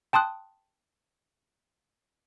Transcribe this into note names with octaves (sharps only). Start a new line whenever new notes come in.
G5 A5 C6 D#6 F#6